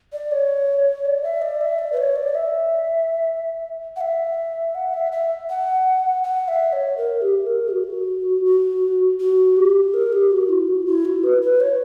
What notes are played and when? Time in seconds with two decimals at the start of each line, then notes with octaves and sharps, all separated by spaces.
0.13 D5
0.31 C#5
1.05 D5
1.23 E5
1.42 D5
1.61 E5
1.79 D5
1.92 B4
1.97 C#5
2.16 D5
2.35 E5
3.96 F#5
4.01 E5
4.75 F#5
4.94 E5
5.12 E5
5.50 F#5
6.24 F#5
6.48 E5
6.73 C#5
6.97 A#4
7.21 G4
7.47 A#4
7.71 F#4
8.45 F#4
9.20 F#4
9.57 G4
9.94 A#4
10.12 G4
10.31 F#4
10.49 E4
10.68 F#4
10.86 E4
11.05 F#4
11.23 B4
11.42 B4
11.60 C#5